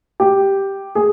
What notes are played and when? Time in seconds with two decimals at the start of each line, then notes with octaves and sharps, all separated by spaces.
0.20 G4
0.95 G#4